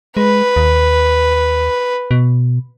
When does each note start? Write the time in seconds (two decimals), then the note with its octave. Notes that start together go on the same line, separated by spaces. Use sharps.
0.17 G#3 B4
0.56 D#2
2.11 B2